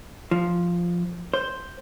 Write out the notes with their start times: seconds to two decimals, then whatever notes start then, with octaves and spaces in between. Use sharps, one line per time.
0.31 F3
1.34 C5